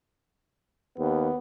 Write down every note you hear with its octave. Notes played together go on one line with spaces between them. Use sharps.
D#2 B3